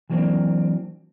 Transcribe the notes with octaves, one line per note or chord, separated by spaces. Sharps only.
E3 F#3 G3 A#3 C4 D4